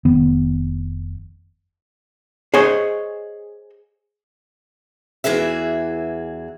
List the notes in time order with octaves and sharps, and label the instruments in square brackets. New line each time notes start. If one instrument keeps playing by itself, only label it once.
[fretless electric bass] F1 D#3 B3
[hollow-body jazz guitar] G#4 C5 C#5 D#5
[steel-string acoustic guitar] E2 E3 F#4 G#4 E5